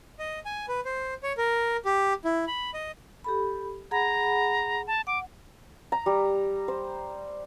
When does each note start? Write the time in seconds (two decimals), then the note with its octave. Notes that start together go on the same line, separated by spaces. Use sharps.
0.19 D#5
0.45 G#5
0.68 B4
0.85 C5
1.23 C#5
1.38 A#4
1.85 G4
2.25 E4
2.47 B5
2.74 D#5
3.24 G4 A4 B5
3.91 G#4 F#5 A#5 B5
4.87 A5
5.07 F#5 D6
5.92 A#5
6.06 G3
6.68 C5